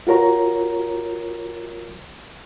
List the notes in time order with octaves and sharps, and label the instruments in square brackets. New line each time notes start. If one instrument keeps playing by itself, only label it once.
[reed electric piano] F4 F#4 A#4 C#5 A#5